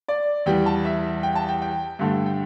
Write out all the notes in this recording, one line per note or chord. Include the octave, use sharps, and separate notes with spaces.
D5
E2 E3 G3 G5
A5
E5
G5
A5
G5
G5
G2 D3 A3
G5